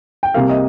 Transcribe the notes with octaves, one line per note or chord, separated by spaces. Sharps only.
G5
C2 C3 G3 A#3 F5
D#5